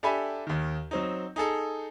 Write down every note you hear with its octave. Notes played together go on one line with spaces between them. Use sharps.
D4 G4 A4 E5 G#5 B5
D#2 D#3
F#3 C4 D#4
D#4 G#4 A4